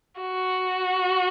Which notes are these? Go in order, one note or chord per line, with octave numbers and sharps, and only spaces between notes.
F#4